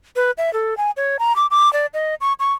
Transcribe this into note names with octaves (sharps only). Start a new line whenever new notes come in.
B4
E5
A4
G#5
C#5
A#5
D6
D6
D5
D#5
C#6
C#6